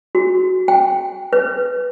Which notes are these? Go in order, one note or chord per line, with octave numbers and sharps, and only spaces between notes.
F#4
G5
B4